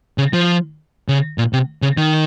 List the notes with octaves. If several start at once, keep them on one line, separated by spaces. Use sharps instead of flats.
C#3
F3
C#3
A#2
C3
C#3
D#3